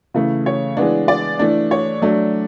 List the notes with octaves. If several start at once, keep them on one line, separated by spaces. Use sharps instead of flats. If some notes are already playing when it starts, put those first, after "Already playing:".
C#3 E3 A3
C#5
E3 G#3 B3 D4
D5
E3 A3 D4
C#5
F#3 A3 D4